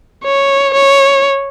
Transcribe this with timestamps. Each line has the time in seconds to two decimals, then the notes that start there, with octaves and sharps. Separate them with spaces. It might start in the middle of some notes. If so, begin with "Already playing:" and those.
0.24 C#5
0.74 C#5